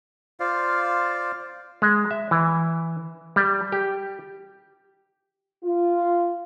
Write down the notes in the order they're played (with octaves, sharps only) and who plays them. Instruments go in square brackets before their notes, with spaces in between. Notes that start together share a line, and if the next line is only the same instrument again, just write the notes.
[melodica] F4 C5 D5 F5
[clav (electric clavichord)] G#3
E5
E3
G3
G4
[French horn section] F4